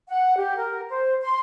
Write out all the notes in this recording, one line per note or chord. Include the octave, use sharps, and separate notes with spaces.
F#5
G4
A#4
C5
C6